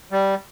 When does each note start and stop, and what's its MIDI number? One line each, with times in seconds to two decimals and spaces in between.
0.12 0.35 55